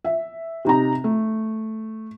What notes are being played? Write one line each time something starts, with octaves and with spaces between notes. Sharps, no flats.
E5
C3 D#4 A#5
A3